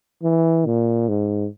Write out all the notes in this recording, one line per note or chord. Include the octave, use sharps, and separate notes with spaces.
E3
A#2
G#2